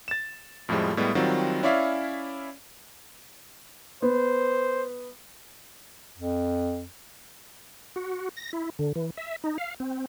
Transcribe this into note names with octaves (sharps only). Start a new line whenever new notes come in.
A6 E7
F2 A2 F3 G3 G#3
A2 G3 G#3 B3
D#3 F#3 G3 C4 F4 F#4
C#4 E4 C#5 D5 E5 F5
B3 C5
F2
F#4
A#6
E4
D3
E3
E5
D#4
F5
C4